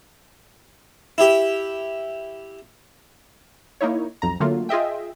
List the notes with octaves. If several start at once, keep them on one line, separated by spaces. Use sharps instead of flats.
E4 G4
A#3 D#4 E4 C#5
B1 F2 A#5
D3 F#3 A3 A#3 F4
F4 G#4 D#5 E5 G5